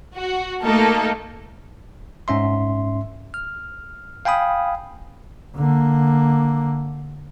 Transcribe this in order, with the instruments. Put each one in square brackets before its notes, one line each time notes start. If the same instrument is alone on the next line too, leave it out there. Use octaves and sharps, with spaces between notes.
[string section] F#4
A3 A#3 D#4 A4 A#4
[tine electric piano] G#2 C#4 E5 C6
F6
F5 G5 G#5 B5 D#6
[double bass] D3 A#3